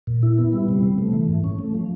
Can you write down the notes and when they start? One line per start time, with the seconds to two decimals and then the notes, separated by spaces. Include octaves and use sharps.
0.07 A#2
0.23 E4
0.38 B3
0.53 G3
0.68 C3
0.83 C3
0.98 A3
1.13 E3
1.29 G#2
1.44 C#4
1.59 A3
1.74 F3